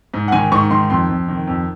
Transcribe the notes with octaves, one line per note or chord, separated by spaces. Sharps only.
G#2
F#5
D#3 G#5
G#2 C#6
D#3 C6
F2 C6
F2
D#3
F2